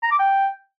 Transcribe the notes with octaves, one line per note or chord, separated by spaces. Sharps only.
A#5
D6
G5